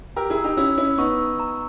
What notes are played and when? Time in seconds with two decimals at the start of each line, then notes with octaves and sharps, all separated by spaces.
0.16 G4 A#4 E6
0.30 E4 G#4
0.37 E6
0.44 D#4 G4
0.57 C#4 E4 E6
0.77 C#4 E4 E6
0.98 B3 D#4 C#6
1.18 E6
1.40 A#5